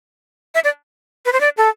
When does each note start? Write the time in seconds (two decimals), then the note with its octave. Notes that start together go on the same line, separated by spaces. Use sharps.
0.55 E5
0.64 D5
1.26 B4
1.33 C5
1.41 D5
1.57 A4